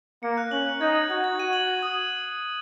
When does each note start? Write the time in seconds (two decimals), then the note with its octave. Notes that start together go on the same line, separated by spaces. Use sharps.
0.23 A#3 C#7
0.38 F#6
0.51 C#4 F#7
0.67 F#6
0.81 D#4 G#6
0.95 G#6
1.09 F#4 G#6
1.24 G#6
1.39 F#4 D#7
1.53 F#7
1.68 G#6
1.83 D#6